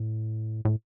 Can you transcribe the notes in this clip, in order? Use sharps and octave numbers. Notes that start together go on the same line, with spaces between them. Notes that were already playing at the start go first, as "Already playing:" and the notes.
Already playing: A2
A2